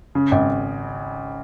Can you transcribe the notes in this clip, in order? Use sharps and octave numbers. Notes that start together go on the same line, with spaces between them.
C#3
G#1